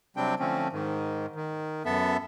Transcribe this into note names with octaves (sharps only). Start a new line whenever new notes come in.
C3 F#3 G3 C4 D4 G5
D3 F3 A3 C4 C#4
G#2 D#3
D#3
F#2 B3 A4 E5